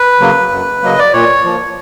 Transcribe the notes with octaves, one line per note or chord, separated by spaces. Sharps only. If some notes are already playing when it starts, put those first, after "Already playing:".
Already playing: B4
C#3 F#3 A#3
F#2
C#3 F#3 A#3 D#5
D5
A#2 C#5
F3 A#3